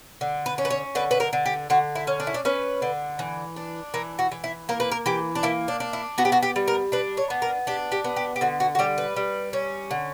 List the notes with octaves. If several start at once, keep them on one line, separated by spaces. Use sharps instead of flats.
D3
B4
C#4
B4
C#5
D3 B4
B4
A#4
D3
G4
D3 F#4
E4
C#4
D4
E4
D4
C#4 B4
D3
E3
D4
E3 A#4
F#4
E3
E4
A#3 A#4
B4
A#4
E3 G4
D4
A#3 E4
D4
D4
E4
B3 F#4
G4
F#4
G4
G3
A#4
D4 B4
C#5
B3
A#4
D4 G4
G4
B3
G4
G4
D3 F#4
F#4
F#4
G3 G4
B4
G3
C#4
D3